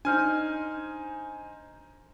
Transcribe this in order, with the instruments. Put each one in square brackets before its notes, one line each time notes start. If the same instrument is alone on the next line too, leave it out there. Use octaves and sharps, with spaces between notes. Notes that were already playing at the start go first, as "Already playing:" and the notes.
[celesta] D4 F6 G6 [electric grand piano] D#4 C5 G#5